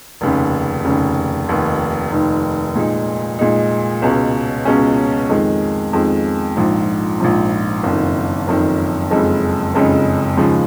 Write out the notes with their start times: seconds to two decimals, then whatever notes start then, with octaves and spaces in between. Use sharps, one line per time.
0.21 F1 D#2 C#3
0.85 F1 D#2 C#3
1.48 F1 D#2 D#3
2.11 F1 D#2 D#3
2.75 A#2 G#3 D#4
3.39 A#2 G#3 D#4
4.02 C#2 B2 G#3 C#4
4.65 C#2 B2 G#3 C#4
5.29 F2 D#3 G#3
5.93 F2 D#3 G#3
6.57 A#1 G#2 F3
7.20 A#1 G#2 F3
7.83 F#1 F2 D#3
8.47 F#1 F2 D#3
9.11 F#1 F2 C#3 G#3 D#4
9.74 F#1 F2 C#3 G#3 D#4
10.37 D#2 C#3 F3 G#3